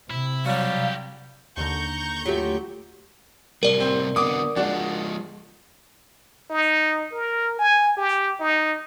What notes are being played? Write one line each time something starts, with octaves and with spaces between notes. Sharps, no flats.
C3 E4
F#3 G3 F#4 G4 F5
D#2 D3 A#5 C#6 G6
F#3 A3 F4 G4
A2 C3 G3 A#4 D5
C4
D3 B3 F#4 D6 D#6
F3 G#3 D4 F#4
D#4
A#4
G#5
G4
D#4